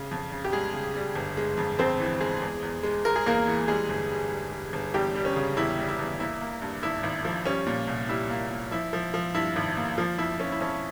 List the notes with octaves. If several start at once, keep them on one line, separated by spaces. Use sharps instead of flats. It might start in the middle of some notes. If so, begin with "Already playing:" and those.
Already playing: C#3
F2
C#3
G4
G3 G#3 G#4
C#3
G3
G1
G#3
F2
F2 C4 C5
E3
G#3 G#4
E2
E2
G#3
G#3 A#4
G#4
E2 A#3 A#4
E3
G3 G#3 G#4
G1
G3
G3
G3
G1
E2 G3 G4
G3
C#4
C#3
E2 E4
G3
E4
E2
A#3 E4
A#3
G2
G#1 E4
G#1
F3
G3 C#4
A#2
C2
G3 E4
A#3
A#3
F3 E4
F3
F3
G2 E4
G#1
A#3
F3 F4
F2 E4
F3 C#4
E4
F2 C#4